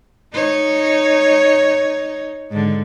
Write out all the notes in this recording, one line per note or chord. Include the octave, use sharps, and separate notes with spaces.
D#4 C#5
G#2 D3